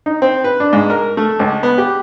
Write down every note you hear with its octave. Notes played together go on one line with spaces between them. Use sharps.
D#4
C4
B4
D4
G#2
A#4
A3
C#2
B3
G4